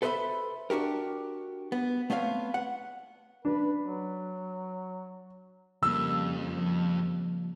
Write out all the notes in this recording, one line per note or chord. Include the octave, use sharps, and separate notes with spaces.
A4 B4 C5 D5 E5 B5
D4 F#4 G4 A#4
B3
A3 B3 C4 C#5 F5
F#5
D4 B4
F#3
F2 C#3 F3 G3 A#3 E6